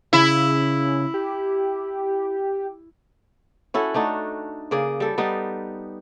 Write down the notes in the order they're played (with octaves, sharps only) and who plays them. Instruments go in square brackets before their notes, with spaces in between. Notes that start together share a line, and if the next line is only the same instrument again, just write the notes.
[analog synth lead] C#3 [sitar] E4
[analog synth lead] G4
[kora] C#4 E4 F#4 A4
A3 D4 D#4 F#4
C#3 A#3 G#4 D5
G3 A4
G3 B3 D#4